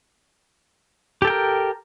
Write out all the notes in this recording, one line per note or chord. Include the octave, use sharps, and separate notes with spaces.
G4 A4 A#4 G5